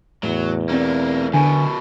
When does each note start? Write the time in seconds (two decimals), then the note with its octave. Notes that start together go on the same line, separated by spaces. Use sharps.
0.23 E2 A2 F#3
0.69 B1 A3 A#3 C4 D5
1.34 F#2 B2 D3 B4 G#5